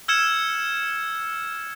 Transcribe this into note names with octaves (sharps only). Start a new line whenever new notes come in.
E6 F6 G#6 C#7 E7